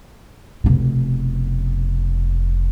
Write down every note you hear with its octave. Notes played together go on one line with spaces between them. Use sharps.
F1 B2